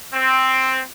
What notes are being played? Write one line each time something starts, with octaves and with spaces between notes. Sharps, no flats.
C4